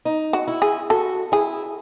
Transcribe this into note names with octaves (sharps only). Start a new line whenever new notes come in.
D#4
F#4
E4
G#4
F#4 A4
E4 G#4